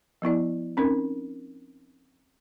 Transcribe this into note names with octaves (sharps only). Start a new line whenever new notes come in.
F3 B3 E4 D5
C4 C#4 D#4 A#4